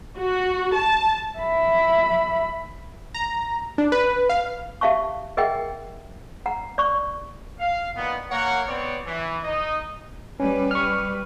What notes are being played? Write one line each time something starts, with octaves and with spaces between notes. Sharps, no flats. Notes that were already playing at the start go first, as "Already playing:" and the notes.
F#4
A5
E5 B5
A#5
D4
B4
F5
G4 E5 F5 A5 C#6
G#4 A#4 D#5 E5 F#5 G5
F#5 A#5
D5 C#6
F5
A#2 D#3 B3
A#3 A#4 C#5 F#5
B3 C4 C#5 D5
E3
D#4 D#5
G3 C#4 B4
C#6 F6